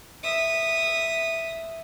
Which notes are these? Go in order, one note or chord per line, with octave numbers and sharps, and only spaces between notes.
E5 D#6